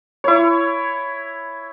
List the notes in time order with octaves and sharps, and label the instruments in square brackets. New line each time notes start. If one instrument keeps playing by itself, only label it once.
[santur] E4 C#5